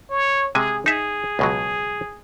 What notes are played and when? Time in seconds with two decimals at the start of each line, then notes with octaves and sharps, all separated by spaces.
0.10 C#5
0.55 C3 G#3 G#4 G#5
0.86 D#4 G#4 E5
1.39 C#2 B2 F#3